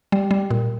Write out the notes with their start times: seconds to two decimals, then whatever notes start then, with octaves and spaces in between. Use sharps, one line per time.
0.12 G3
0.31 G3
0.51 A#2